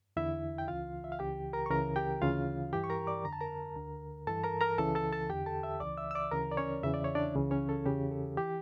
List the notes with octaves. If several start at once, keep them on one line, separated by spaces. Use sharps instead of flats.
E2 D3 E4 E5
G5
C#2 C#3 E3 F4 F5
E5
F5
C#2 C#3 E3 G4 G5
A#4 A#5
C#6
C#2 C#3 E3 A#4 A#5
G4 G5
D2 C#3 E3 F4 F5
G2 E3 G4 G5
C#6
A#4 A#5
D5 D6
F2 D3 A#5
A5
A#4 A#5
D2 D3
G2 E3 A4 A5
A#4 A#5
A#4 A#5
C#2 C#3 E3 A4 A5
A4 A5
A4 A5
E2 D3 G4 G5
A4 A5
E5 E6
C#2 C#3 E3 D5 D6
E5 E6
E6
D5 D6
D2 C#3 E3 A#4 A#5
D5
C#4 C#5
E2 C#3 E3 E5
D5
C#5
D4 D5
C#2 C#3 E3
C#4 C#5
A4
E2 C#3 E3 G4
A4
E3 G4 G5